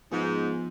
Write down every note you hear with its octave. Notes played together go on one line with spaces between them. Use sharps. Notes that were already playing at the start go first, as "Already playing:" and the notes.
G#2 F3 B3 F4 G#4